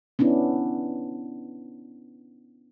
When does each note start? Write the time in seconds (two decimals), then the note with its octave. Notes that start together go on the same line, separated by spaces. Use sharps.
0.19 B3 C#4 D4 E4